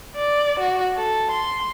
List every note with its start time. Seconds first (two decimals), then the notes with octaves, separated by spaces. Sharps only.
0.16 D5
0.59 F#4
0.97 A4
1.31 C6